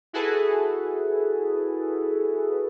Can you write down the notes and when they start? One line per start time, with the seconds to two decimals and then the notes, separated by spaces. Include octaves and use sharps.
0.13 E4 F#4 G#4 A4 B4